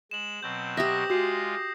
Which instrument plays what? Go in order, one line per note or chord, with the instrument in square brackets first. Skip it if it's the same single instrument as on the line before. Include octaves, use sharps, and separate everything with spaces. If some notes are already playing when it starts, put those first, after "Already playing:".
[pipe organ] G#3 [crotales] E7 F#7
[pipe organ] B2 F#3 C4 [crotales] G6
[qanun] G4 E5 [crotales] D6 D#6 A#6
[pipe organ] G#3 F4 [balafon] F#4 [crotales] G6 C7